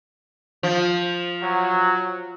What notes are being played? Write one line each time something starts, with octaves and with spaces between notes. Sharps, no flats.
F3
F#3